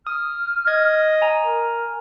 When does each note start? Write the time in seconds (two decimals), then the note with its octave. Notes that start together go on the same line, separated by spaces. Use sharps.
0.07 D#6 F6
0.67 D#5 G#6
1.22 G#5 A#5
1.44 A#4